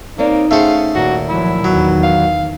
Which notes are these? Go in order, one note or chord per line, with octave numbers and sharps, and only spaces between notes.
A#3 C4 D#4 C#5 D5
A3 C#4 G#4 C5 F5 F#5
D#2 A#2 F#4 A#4
F3 F#3 E4
E2 D#3 F#3
F5